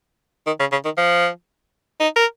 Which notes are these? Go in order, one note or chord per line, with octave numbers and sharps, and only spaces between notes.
D#3
C#3
C#3
D#3
F3
D#4
A#4